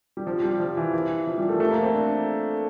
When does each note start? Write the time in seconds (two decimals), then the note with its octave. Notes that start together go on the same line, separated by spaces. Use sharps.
0.17 G3
0.27 F3
0.44 G3
0.60 F3
0.77 E3
0.93 E3
1.27 F3
1.38 G3
1.49 A3
1.60 A3
1.71 A#3
1.82 C4
1.93 D4